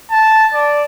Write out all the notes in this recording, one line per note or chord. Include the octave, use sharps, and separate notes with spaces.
A5
D5